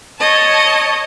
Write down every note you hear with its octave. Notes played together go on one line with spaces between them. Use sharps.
C#5 D#5 A5